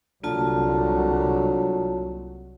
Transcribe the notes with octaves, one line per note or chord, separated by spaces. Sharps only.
C2 D3 F#3 A#3 F4 A5